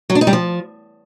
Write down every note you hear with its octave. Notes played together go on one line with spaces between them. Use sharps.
F#3
D4
D#4
G3
F3